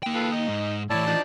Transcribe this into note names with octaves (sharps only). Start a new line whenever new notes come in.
A#3 G5
F4 A4 B4
D#4 D#5
G#2
A2 E3 E4 C#5 D5 A5
F3 D4 D#4